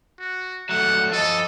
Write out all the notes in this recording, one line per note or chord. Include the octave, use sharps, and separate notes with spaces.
F#4
F#3 A3 F#5
F3 A4 D#5